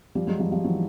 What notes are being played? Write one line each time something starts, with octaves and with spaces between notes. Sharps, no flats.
F3 G3
F#3 G#3
F3 G3
F3 G3
E3 F#3